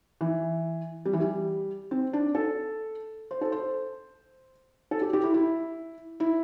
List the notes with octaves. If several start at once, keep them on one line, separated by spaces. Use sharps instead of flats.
E3
G3
E3
G3
C4
D4
A4
C5
A4
C5
A4
G4
G4
E4
E4
E4